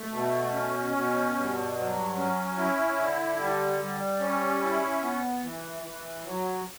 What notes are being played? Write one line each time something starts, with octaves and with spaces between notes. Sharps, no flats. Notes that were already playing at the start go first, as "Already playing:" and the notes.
Already playing: A3
B2
C#4
B2
G2
F#3
C#4
E4
D3
G3
G3
C#4
E4
B3
E3
E3
F#3